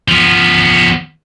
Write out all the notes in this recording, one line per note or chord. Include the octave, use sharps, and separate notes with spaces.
F3 B3